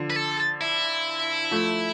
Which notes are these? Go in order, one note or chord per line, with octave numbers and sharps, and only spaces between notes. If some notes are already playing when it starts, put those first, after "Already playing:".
Already playing: D3 F3
B4
A4
E4
F3 A3